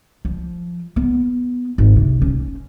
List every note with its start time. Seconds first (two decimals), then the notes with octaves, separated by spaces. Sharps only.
0.25 F3
0.96 B3
1.78 G#1
1.96 C3
2.22 C#4